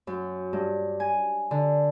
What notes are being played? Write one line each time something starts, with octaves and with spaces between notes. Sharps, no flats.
F#2
G2
G#5
D3